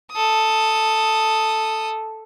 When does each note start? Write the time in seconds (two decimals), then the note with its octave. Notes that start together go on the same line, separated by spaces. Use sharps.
0.12 A4 D#6